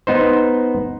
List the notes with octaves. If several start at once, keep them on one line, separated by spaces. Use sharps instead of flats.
B3 D#4 C5